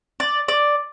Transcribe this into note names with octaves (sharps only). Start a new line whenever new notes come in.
D5
D5